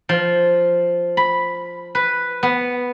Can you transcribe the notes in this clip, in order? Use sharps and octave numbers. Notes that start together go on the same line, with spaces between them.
F3
B5
B4
B3